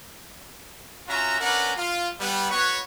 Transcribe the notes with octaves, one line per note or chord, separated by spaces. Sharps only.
C#4 F4 F#4 E5 A#5
C#4 D4 A#4 B4 D5 F#5
F4
G3 B3
B3 F#4 B4 C#5